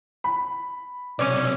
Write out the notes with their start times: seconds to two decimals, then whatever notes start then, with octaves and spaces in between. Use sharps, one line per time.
0.24 B5
1.19 B1 C3 C#4 C#5 D5